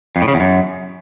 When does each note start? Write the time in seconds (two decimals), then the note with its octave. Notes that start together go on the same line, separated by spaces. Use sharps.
0.16 F2
0.22 A2
0.28 C#3
0.34 E2
0.40 F#2